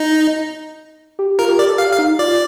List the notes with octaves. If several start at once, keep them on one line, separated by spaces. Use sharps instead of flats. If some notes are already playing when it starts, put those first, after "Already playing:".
Already playing: D#4
G4
F4 A#4
G4
A#4 D5
A4
G4 F5
F5
D#4
F4 D5